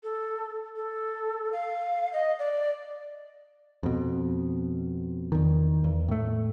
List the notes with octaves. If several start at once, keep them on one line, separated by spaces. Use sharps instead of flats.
A4
A4
F5
D#5
D5
F2 B2
E2 D#3
E2
A2 A3